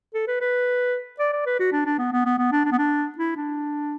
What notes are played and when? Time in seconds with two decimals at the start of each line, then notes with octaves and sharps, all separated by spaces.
0.14 A4
0.27 B4
0.41 B4
1.19 D5
1.33 D5
1.46 B4
1.60 F#4
1.72 D4
1.86 D4
1.98 B3
2.12 B3
2.25 B3
2.38 B3
2.52 D4
2.65 D4
2.72 B3
2.78 D4
3.18 E4
3.36 D4